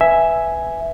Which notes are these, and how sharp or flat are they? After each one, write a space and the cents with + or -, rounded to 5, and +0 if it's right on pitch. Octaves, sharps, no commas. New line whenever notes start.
B4 +5 E5 +0 G#5 +0